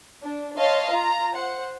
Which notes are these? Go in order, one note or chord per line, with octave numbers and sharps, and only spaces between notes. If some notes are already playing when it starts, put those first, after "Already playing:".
D4
C#5 D#5 F5 A5 C6
F4 A#5
C5 F#5